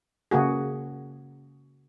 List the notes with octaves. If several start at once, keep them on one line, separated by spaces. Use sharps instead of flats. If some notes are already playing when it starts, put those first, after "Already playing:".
C#3 A#3 F#4 G#4